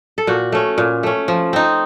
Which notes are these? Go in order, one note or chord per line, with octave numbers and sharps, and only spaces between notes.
A4
A#2 F#4
A3 C#4
A#2
A3 C#4
F3
C4 D#4